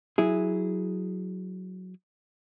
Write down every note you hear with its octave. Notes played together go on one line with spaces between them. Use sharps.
F#3 E4 G#4